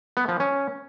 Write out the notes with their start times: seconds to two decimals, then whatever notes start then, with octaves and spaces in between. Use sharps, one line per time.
0.17 B3
0.28 F3
0.40 C#4